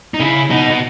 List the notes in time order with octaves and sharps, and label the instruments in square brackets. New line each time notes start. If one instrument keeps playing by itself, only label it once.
[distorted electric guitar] D#4
[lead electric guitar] C#3 [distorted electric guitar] E4
[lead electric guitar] B2 [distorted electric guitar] D#4
[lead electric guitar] B2